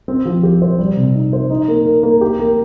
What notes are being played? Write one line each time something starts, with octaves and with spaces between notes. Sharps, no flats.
C4
F3
G4
C5
G3
C3
D#4
C5
D#4
A#3
A#4
A#3
G4
A#3